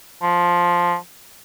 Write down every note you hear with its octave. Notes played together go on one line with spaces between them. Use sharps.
F3